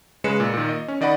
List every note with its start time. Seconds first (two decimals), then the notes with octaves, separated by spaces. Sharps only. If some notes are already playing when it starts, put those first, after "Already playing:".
0.24 C#3 G#3 B4 C#7 E7
0.40 A#2
0.54 A#2 D#3
0.69 D#5
0.88 C#4
1.01 D#3 D5 D#5 F#5 B5